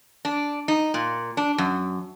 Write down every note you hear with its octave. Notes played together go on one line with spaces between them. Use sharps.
D4
D#4
A#2
D4
F#2